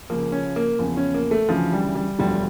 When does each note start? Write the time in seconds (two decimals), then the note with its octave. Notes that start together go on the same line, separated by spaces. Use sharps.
0.10 C#2 C#3 F3 A#3
0.32 C#4
0.56 A#3
0.79 E2 C#3 F3
0.97 C#4
1.14 A#3
1.31 A3
1.49 D2 C#3 E3 F3
1.72 G3
1.95 G3
2.19 E1 D2 D3 F3 G3